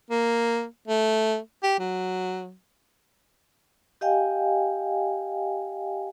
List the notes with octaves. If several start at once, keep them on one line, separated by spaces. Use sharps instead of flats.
A#3
A3
G4
F#3
G4 D#5 F5 G5 G#5